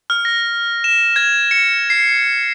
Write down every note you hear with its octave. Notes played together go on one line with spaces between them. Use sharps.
F6
A#6
E7
G#6
C#7
C7